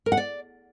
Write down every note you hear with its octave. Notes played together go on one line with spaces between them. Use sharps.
A#4
F#5
D5